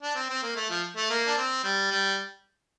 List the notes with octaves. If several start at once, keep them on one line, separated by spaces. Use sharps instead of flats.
D4
C4
C4
A#3
A3
F3
A3
A#3
D4
C4
G3
G3